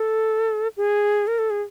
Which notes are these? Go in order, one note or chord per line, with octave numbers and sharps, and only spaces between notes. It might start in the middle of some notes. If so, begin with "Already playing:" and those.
Already playing: A4
G#4
A#4
A4
G#4